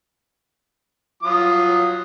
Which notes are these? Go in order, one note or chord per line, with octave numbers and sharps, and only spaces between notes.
F#3 F4 D#6